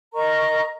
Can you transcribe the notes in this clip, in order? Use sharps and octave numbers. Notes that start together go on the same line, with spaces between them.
A#4 D#5 A#5 C#6